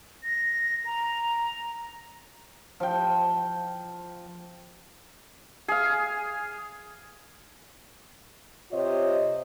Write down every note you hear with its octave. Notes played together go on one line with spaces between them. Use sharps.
A#6
A#5
F3 G5
G#4 F5
C3 F4 C5 C#5 D#5